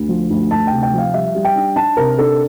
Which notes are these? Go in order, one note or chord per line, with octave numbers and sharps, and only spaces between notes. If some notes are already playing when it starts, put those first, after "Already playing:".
Already playing: D2
F3
D2
D2 A5
G5
C3
G5
F3 F5
G3 E5
G3
G5
D4
D4 A5
C3 A#4
D4 A4